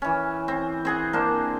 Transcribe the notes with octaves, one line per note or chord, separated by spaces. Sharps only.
E3 C#4
C4
C4 G#4 F#5
A#3 D4 C5